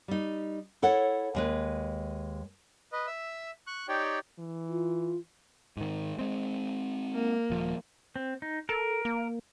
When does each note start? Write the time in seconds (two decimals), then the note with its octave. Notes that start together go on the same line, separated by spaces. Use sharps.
0.08 G3 D#4
0.82 E4 A4 C#5 F#5
1.35 D#2 G#3 B4
2.92 B4 D#5
3.07 E5 E6
3.67 C#6 F#6
3.88 D#4 G4 C#5 D5 G5
4.39 E3
4.69 F4
5.77 G#2 D#3
6.19 G#3 C4
7.14 A#3
7.50 D#1 F3
8.16 C4
8.42 D#4
8.69 A4 A#4
9.05 A#3